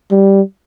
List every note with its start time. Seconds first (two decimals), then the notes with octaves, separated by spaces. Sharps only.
0.11 G3